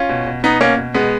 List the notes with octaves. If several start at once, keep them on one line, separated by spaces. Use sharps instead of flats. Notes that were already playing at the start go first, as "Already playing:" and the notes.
Already playing: C#4 F4
B2
B2
B2 B3 D#4
B2 A#3 C#4
B2
B2 G#3 B3